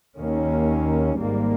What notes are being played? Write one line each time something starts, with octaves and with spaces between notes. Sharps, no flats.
D#2 D#3 A#3 C#4
G#1 G#2 G3 A#3